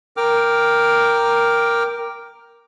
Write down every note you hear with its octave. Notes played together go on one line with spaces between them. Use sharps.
A#4 G5 D6 F6